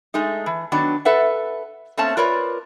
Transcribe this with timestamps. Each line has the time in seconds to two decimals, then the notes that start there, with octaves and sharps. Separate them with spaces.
0.14 G#3 A3 D#4
0.46 E3
0.72 D#3 F#3 B3 D4
1.05 A4 B4 E5 F#5
1.97 A3 A#3 C4 C#4 A5
2.17 F4 A#4 B4 C#5 D5